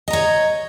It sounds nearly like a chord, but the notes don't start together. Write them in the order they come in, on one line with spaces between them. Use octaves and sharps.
D#5 A#5 C#5